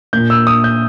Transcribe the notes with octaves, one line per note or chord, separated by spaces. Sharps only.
A#2 A#3 G6
E6
D#6
G6